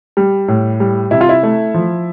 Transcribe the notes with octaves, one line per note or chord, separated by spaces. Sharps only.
G3
A2
G3
C3 E4
F4
E4
A3
F3